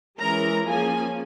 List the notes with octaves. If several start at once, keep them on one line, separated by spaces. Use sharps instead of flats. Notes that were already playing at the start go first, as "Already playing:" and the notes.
E3 G#3 C#4 A#4 A#5
F3 A#3 C#4 G#4 G#5